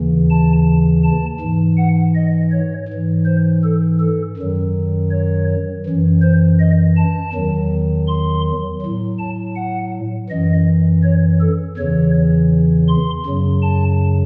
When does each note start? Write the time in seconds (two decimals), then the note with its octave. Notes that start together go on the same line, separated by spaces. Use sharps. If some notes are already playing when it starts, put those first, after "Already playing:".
Already playing: D#2 C#3 E3
0.30 A5
1.04 A5
1.40 G#2 E3
1.77 F#5
2.15 D#5
2.52 C#5
2.88 G#2 E3
3.26 C5
3.64 A4
4.00 A4
4.37 F#2 D#3 F#3
5.11 C#5
5.86 F#2 E3
6.22 C5
6.59 D#5
6.97 A5
7.33 E2 D#3 F#3
8.08 C6
8.81 A2 F#3
9.19 A5
9.56 F#5
10.29 F#2 E3 D#5
11.03 C#5
11.41 A4
11.77 E2 C#3 E3 C#5
12.88 C6
13.26 F#2 C#3 F#3
13.62 A5